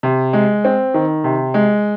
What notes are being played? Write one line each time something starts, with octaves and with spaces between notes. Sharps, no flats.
C3
G#3
C4
D#3
C3
G#3